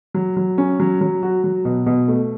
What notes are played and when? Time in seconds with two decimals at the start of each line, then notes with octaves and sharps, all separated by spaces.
0.14 F#3
0.37 F#3
0.58 C#4
0.80 F#3
1.01 F#3
1.22 F#4
1.44 F#3
1.65 B2
1.86 B2
2.08 A3